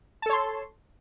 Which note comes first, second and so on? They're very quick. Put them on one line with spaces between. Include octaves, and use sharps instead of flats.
A5 A4 C#5 C6